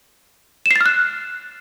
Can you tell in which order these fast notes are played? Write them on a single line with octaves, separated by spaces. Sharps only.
E7 C7 A6 F6 F#6